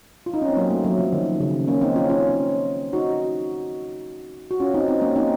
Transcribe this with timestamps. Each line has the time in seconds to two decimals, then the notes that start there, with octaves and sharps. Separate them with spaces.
0.26 F4
0.34 D#4
0.42 C#4
0.49 C4
0.57 F#3 A#3
0.71 A3
0.84 F#3
0.99 F3
1.13 D#3
1.40 C#3
1.68 A#3 C#4
1.82 C4 D#4
1.96 C#4 F4
2.10 C#4 F4
2.93 D#4 F#4
4.51 F#4
4.60 C#4 F4
4.74 C4 D#4
4.88 C4 D#4
5.02 A#3 C#4
5.16 C4 D#4